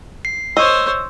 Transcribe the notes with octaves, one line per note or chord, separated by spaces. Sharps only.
C7
C5 C#5 D#5 E6